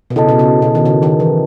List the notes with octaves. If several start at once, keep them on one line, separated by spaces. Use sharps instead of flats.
B2
C#3 E4 A4 D#5 A5
B2
C#3
B2
D#3
C#3
D#3
E3